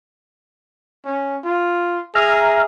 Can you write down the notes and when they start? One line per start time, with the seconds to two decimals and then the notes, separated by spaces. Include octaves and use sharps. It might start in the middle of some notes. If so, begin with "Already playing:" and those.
1.05 C#4
1.44 F4
2.15 G#4 E5 A#5 F6